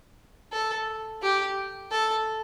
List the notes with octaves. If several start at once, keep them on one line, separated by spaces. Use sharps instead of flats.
A4
G4
A4